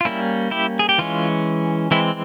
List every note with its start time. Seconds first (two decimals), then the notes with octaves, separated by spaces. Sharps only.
0.01 F4
0.05 G3 A#3 C#4 E4
0.51 E4 G4
0.79 G#4
0.89 G4
0.98 E3 G#3 C#4 F4
1.91 E3 G#3 C4 E4